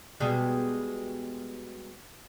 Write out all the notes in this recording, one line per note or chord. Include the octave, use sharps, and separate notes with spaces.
B2 G3 G#3